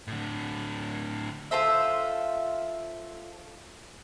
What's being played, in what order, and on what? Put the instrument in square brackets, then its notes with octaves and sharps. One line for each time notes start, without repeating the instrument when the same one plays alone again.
[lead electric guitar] A2 D3
[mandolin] F4 A4 C5 E5